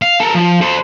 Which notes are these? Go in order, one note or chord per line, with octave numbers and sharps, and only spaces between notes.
F5
A4 A#4
F3
A4 C5